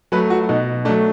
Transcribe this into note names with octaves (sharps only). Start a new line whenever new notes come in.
F#3 A3 B4
F#4
B2 D#4
F#3 A3 D4